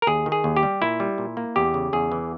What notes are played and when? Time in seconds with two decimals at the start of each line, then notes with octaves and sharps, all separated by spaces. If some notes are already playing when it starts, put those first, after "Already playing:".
0.02 A#4
0.07 D#2 G#4
0.26 D#3
0.32 G#4
0.44 D#2
0.57 G4
0.63 G3
0.82 A#2 E4
1.00 G3
1.18 A#2
1.37 A#3
1.56 E2 G4
1.74 C#3
1.93 E2 G#4
2.12 E3